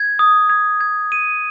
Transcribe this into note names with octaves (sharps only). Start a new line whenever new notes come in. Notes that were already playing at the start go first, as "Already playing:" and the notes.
Already playing: G#6
D#6
G#6
G#6
D#7